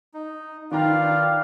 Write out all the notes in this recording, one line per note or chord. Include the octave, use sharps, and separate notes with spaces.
D#4
D#3 F4 B4 D5 F5 G5 A#5